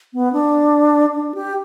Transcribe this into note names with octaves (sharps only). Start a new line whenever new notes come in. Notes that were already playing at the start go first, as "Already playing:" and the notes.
B3
D4
D4
G4